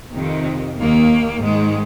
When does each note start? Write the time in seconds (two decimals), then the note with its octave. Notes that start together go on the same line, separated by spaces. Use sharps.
0.15 F2 C3 D#3
0.78 D#2 D#3 A#3
1.40 G#2 D#3 G#3